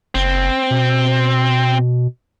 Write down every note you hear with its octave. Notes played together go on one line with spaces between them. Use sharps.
F#1 C4
B2